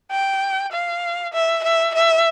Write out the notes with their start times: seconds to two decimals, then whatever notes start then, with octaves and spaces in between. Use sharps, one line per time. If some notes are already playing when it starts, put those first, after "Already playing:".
0.11 G5
0.72 F5
1.33 E5
1.63 E5
1.94 E5